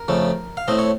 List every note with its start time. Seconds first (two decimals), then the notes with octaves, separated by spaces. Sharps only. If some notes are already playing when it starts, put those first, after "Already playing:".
Already playing: A#4
0.08 F2 C#3 A3
0.57 F5
0.68 A2 A3 C4 D#5
0.79 C#5